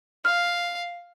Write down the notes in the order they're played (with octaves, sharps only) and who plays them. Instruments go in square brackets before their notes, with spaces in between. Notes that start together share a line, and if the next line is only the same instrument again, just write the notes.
[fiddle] F5 [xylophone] F6